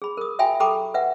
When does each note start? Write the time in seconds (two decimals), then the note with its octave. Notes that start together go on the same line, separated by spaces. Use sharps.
0.02 G#4 B5
0.17 A#4 D#6
0.39 F4 F#4 E5 G5 G#5 B5
0.60 G4 A4 G5 A#5 B5 D6
0.94 B4 E5 F#5